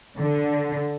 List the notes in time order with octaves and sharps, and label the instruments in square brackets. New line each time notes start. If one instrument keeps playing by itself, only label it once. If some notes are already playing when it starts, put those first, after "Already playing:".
[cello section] D3